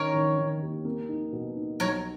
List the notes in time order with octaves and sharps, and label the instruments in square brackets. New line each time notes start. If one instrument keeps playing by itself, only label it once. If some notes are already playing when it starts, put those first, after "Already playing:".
Already playing: [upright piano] D#3 C#4 [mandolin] A#4 C#5
[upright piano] D#3
D#3
D#2
A#3
D#4
B2
D#4
[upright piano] B1 [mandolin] A#4 C#5